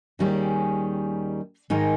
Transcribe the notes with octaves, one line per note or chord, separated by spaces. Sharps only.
D#2 D#3 G3 C#4 G#4
G#2 D#3 G#3 D#4 A#4